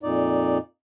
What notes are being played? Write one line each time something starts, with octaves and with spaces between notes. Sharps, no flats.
F2 A#2 D#4 D5